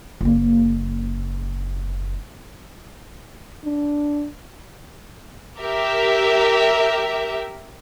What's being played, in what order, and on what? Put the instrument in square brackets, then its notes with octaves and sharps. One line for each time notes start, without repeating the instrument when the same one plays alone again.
[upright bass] F#1 A#3
[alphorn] D4
[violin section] G4 A#4 E5